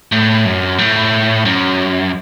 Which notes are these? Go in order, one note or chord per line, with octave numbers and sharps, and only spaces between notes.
A2
F#2
A2
F#2